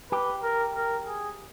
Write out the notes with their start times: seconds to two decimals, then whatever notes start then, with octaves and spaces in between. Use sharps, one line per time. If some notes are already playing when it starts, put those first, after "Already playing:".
0.11 G4 B4
0.43 A#4
0.75 A#4
1.06 G#4